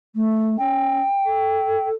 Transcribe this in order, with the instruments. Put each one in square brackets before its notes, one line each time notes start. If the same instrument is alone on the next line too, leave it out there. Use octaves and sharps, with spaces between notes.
[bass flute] A3
[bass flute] C#4 [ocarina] G5
[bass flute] A4